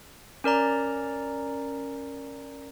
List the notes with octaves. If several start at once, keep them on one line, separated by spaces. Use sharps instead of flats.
C#4 A#4 D5 A#5